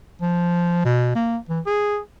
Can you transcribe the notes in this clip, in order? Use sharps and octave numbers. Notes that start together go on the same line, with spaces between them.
F3
B2
A#3
E3
G#4